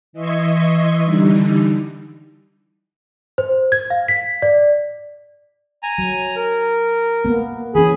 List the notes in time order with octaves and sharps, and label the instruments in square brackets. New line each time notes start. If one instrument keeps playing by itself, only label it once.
[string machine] E3 D#5 E5 C6 C#6 G#6
D3 E3 G3 D#4
[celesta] C5
G#6
F5
B6
D5
[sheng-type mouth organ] G#5 A#5
[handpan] F#3
[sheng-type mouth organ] A#4
[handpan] A#3 B3
[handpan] E3 C#4 [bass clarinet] G#4 [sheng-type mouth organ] B5